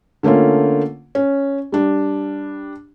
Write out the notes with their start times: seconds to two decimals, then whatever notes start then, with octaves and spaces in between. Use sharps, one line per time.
0.23 D3 A3 A#3 C#4 F4
1.15 C#4
1.72 G3 D4